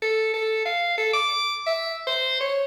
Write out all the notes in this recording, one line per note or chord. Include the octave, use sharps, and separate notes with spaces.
A4
A4
F5
A4
D6
E5
C5
C#5